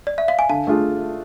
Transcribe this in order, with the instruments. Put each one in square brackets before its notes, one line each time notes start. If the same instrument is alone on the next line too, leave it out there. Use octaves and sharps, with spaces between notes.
[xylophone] D5
E5
F5
G#5
[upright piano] D3 [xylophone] F5 A5
[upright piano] A3 D4 F4 G#4